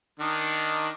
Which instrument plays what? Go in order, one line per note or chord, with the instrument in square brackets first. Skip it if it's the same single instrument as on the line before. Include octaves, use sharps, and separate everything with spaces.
[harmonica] D#3 D4 D#4